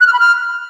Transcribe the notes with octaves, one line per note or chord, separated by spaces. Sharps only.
F#6
F6
B5
F6